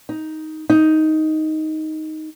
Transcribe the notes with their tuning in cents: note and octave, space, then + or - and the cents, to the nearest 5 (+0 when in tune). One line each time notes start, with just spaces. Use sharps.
D#4 +10
D#4 +5